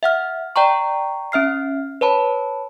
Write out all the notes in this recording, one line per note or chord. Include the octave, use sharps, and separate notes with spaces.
E5 F#5 F6
D5 G5 A#5 C#6
C#4 E5 F6 C7
B4 C#5 A5 B5